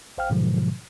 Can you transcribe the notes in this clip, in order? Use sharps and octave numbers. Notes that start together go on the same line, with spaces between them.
A#1 C5 F5 G5 F6
G#2 B2 D3 F3 F#3 G#3